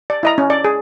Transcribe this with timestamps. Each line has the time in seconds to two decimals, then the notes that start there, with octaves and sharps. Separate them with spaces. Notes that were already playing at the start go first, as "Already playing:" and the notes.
0.10 D5
0.23 E4 D#5 A#5
0.38 C#4
0.50 D5
0.64 G#4